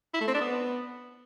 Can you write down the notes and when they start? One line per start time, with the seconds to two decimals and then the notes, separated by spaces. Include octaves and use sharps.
0.14 E4
0.21 A3
0.27 C4
0.34 D4
0.41 B3